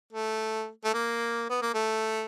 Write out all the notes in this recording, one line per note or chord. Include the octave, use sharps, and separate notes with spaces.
A3
A3
A#3
B3
A#3
A3